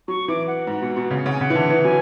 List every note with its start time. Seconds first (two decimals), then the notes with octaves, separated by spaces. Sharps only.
0.08 F#3 C#6
0.28 E3 D6
0.47 F#5
0.67 G#2
0.82 B2
0.97 B2
1.11 C#3
1.26 C#3 F#5
1.33 G#5
1.41 C#3 F#5
1.50 E3
1.55 D3
1.70 E3
1.84 F#3 G#5